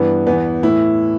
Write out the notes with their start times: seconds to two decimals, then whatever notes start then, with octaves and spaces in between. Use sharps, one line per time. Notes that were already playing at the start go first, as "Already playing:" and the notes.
Already playing: G2 E3 B3
0.26 E2 E3 B3
0.63 A2 E3 E4